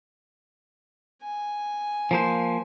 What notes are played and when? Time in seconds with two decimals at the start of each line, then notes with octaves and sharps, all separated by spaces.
1.22 G#5
2.11 F3 A#3 C5